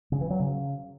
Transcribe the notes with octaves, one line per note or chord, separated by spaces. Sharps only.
C#3
E3
F#3
C#3